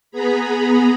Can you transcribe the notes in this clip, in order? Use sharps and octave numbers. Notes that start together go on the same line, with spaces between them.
B3 G#4 A#5 B5